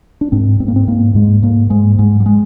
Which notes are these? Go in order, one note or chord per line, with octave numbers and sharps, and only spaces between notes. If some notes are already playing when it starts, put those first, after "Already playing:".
D4
G#2 C4
G#2 C4
A#3
C4
G#2 A#3
G#2 G#3
G#2 A#3
G#2 G#3
G#2 G#3
G3
G#3